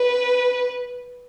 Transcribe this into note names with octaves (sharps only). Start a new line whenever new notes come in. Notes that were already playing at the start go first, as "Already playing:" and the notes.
Already playing: B4